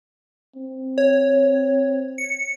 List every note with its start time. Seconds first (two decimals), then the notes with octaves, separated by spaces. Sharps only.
0.56 C4
0.98 C#5
2.18 C#7